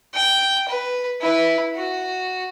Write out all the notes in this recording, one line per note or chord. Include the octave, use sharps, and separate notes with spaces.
G5
B4
E4 B4
F#4